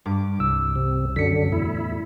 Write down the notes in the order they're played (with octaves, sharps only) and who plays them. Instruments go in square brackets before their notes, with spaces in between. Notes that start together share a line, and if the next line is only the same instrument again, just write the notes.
[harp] G2 D6
[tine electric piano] C2 E6
[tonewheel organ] C3
[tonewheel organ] F#2 D3 [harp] B6 C#7
[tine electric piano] E2 A2 [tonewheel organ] E4